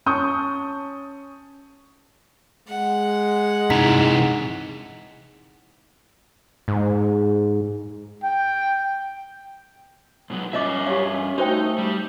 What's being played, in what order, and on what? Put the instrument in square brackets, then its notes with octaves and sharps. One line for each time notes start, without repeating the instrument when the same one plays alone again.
[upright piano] C#4 A5 C#6 D#6 G6
[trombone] G#3 [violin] F#5
[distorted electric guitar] C3 E3 [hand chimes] D#4 A#5 B6
[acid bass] G#2
[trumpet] G5
[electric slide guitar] G#2 B2 F#3
[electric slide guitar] G2 G#3 E5 [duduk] C#4 [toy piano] F4 D#5 D6
[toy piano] G4 F5 [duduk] C#5
[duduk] C#4
[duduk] A3 [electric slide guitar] D#4 [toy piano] F#4 C5 G5
[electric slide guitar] G3